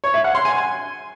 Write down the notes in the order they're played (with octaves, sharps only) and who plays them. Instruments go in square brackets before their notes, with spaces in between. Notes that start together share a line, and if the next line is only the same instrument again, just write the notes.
[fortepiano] C#5
E5
F#5
C6
G#5